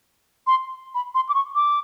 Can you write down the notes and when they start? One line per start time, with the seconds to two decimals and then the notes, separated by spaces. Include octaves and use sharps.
0.47 C6
0.94 B5
1.15 C6
1.29 D6
1.34 C#6
1.55 D6